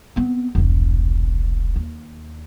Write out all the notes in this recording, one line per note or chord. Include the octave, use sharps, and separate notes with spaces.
B3 C4
E1 C2
D#2